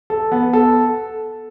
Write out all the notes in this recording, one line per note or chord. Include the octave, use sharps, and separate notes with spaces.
A4
B3
A4